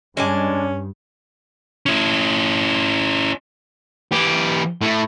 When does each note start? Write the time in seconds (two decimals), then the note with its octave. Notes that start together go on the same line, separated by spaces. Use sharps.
0.17 G2 G#3 C#4 D4 G#5
1.86 C#4 E4
4.12 E3 G4
4.81 A2 A3